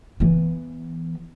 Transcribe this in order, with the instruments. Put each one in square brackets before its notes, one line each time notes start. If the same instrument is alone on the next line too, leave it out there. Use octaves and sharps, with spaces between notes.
[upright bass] E3 B3